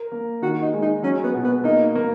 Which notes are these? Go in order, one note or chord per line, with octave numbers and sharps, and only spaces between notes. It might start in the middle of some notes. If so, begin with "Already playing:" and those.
Already playing: A#4
A#3
D#3 F#4
D#4
G#3
D#4
F#3 C#4
B3
B2
B3
A#3 D#4
A#3